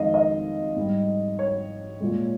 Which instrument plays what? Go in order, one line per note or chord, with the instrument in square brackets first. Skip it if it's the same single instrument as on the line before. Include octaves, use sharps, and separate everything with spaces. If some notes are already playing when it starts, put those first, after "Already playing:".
Already playing: [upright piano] F2 D#3 G#3 D#5 F5
D#5
G#2 G3
C#5
A#2 G#3